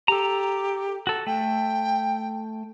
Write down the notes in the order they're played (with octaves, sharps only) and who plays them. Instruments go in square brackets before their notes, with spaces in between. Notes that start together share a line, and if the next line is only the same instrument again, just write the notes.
[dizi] G4 [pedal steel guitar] A4 A#5
[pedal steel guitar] F#4 A4
[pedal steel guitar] A3 [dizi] G5